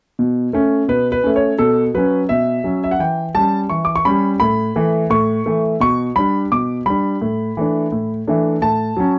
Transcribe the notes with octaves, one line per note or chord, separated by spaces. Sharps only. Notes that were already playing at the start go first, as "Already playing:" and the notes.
B2
A3 C#4
B2 B4
B4
A3 C#4
C#5
B2 A4
F#3 C#4 B4
B2 E5
F#3 C#4
E5
F#5
E3 G5
G3 C#4 A5
E3 C#6
D6
C#6
G3 C#4 B5
A2 B5
E3 A3
A2 C#6
E3 A3
B2 C#6
G3 D4 B5
B2 D6
G3 D4 B5
A2
E3 A3 D4
A2
E3 A3 D4
A2 A5
F#3 C#4